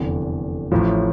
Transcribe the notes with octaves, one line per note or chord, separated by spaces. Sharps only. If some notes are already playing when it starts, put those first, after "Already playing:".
Already playing: F1 E2 D3
A1 A2 F3